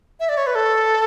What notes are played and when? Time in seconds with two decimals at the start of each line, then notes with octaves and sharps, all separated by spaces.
0.20 E5
0.29 D5
0.37 C#5
0.47 B4
0.55 A4